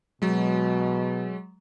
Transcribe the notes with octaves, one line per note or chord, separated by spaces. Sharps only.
B2 F#3 G#3